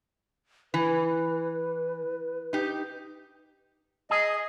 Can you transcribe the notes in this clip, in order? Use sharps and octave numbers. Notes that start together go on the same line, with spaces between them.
E3 B4
D#4 G4
G#4 D#5